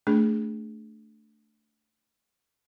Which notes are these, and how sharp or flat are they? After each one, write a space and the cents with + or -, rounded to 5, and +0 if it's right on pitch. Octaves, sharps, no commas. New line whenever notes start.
A3 +0 D4 +0 G#4 +0